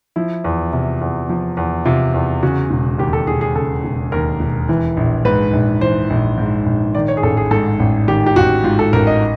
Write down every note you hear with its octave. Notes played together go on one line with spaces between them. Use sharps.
F3 E4
E2
C3
E2
F3
E2
C3 F4
E2
C#3 F#4
E1
D#2 G4
A4
E1 G#4
G#4
C#3 A4
E1
D#2 A#4
E1
E3
A#1
G#2 B4
A#1
E3 C5
A#1
G#2
A#1
D#3 D5
C#5
G#4
A1 A4
G#4
G#2 A4
A1
D#3 G4
G4
A1 F#4
G#2 F4
A4
A1 A#4
D#5